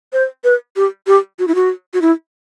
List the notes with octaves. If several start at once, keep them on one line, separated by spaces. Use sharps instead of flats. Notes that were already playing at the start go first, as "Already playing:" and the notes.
C5
B4
G4
G4
F#4
E4
F#4
F#4
E4